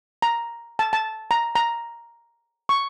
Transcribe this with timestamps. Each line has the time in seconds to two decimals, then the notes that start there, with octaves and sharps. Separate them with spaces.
0.22 A#5
0.79 A5
0.93 A5
1.31 A#5
1.55 A#5
2.69 C#6